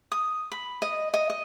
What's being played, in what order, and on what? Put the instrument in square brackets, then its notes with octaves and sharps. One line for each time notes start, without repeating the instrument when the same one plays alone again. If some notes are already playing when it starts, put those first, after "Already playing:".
[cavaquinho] D#6
B5
D#5
D#5
D#5